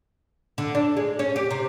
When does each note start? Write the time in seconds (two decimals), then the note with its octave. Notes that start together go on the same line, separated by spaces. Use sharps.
0.58 D3
0.75 D4
0.97 G#3
1.19 C#4
1.36 G4
1.51 C3